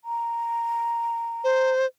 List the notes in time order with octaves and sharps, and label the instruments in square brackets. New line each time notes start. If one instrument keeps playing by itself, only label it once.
[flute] A#5
[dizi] C5